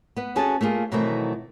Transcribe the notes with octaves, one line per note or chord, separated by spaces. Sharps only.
B3 B4
C#4 F#4 G#4 A4 A5
A3 A#3 F4 G#4
B2 D#3 E3 F#3 A3 C4